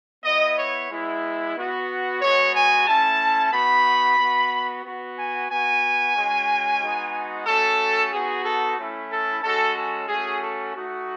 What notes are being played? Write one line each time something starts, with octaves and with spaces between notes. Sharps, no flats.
B3 E4 D#5
C#5
G#3 B3 E4
B3 F#4
G#3 B3 F#4 C#5
G#5
A3 C#4 E4 A5
B3 D#4 F#4 B5
B3 F#4
B3 F#4
G#5
B3 F#4 G#5
G#3 C#4 F#4
G#3 B3 D#4 F#4
A3 C#4 F#4 A4
B3 D#4 F#4 G#4
A4
A3 C#4 E4
A4
G#3 C#4 F#4 A4
A4
A3 C#4 F#4 G#4
A4
A3 D#4 F#4